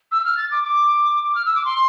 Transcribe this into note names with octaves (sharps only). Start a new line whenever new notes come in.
E6
F6
A6
D6
D6
F6
E6
D6
C6